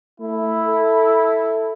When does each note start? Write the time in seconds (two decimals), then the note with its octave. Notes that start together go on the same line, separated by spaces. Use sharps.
0.20 A3 E4
0.66 A4